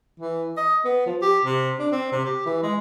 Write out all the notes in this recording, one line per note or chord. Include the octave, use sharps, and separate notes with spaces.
E3
D#5
B3
F3
G4
C3
D4
C4
C3
G4
E3
G#3